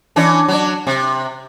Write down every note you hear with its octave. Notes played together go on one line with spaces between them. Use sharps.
E3 C#4 D4
F#3 D4
C3